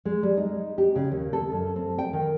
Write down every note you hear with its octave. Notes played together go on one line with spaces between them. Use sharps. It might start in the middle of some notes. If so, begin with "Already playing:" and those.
G#3
G3
D#4
G4
C#3
D#2
A4
F#2
C4
G5
D#3